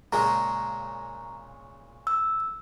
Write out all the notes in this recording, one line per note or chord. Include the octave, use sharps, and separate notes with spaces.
A#2 C#3 G#3 A#5
E6